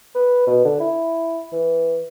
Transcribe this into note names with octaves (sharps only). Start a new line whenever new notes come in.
B4
B2
D3
E4
E3